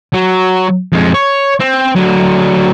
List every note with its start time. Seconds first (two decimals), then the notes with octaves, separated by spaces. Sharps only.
0.13 F#3
0.92 F2 G#3
1.14 C#5
1.60 C4
1.96 D3 F#3